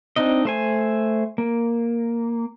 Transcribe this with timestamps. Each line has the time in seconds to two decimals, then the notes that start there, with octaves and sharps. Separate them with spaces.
0.16 C4 D4 D#4 D#5
0.45 A3 C5 G#5
1.38 A#3